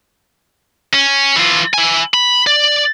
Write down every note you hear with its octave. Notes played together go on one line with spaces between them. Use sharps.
C#4
E3 F4
E4 G#5
B5
D5